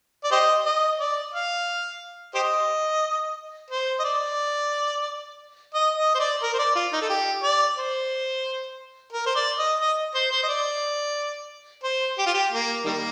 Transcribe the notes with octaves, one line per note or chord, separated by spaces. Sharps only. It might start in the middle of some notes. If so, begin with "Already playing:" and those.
D5
G4 C5 D#5
D#5
D5
F5
G4 C5 D#5
C5
D#5
D5
D#5
D#5
C5
D5
A#4
C5
D5
F4
D#4
A4
G4
D5
C5
A#4
C5
D5
D#5
D#5
C5
C5
D#5
D5
C5
G4
F4
G4
A#3
D#3 G3 A#3